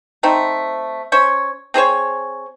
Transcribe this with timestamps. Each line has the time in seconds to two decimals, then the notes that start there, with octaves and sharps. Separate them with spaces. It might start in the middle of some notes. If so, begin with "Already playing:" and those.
0.23 A3 C4 D#4
1.12 C#4 C5 C#5
1.74 C4 G#4 C5 C#5